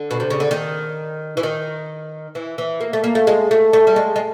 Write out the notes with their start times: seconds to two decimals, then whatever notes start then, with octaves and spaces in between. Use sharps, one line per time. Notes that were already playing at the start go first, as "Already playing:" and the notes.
Already playing: D3
0.11 B2
0.20 C3
0.30 C#3
0.40 D3
0.51 D#3
1.37 E3
1.43 D#3
2.35 E3
2.58 E3
2.81 A#3
2.93 A3
3.04 A#3
3.15 A3
3.27 G#3
3.51 A3
3.73 A3
3.87 G3
3.96 G#3
4.16 G#3